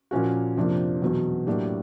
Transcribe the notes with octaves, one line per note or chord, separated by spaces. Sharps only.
A#2 F3 A#3 C#4 F#4
F2 C3 F3 A#3 D4
E2 B2 F#3
A2 F#3 A#3 D4 G4